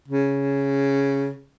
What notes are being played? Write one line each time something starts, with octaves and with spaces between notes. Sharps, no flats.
C#3